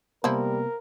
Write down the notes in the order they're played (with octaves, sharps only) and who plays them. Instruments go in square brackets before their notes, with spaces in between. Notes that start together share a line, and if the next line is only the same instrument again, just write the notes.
[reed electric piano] C3 A#3 B3 [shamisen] F3 E4 [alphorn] G3 [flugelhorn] A#4